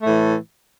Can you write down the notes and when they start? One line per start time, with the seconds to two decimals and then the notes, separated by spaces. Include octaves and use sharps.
0.02 A2 E3 A3